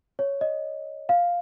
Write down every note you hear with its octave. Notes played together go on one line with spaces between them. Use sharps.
C#5
D#5
F5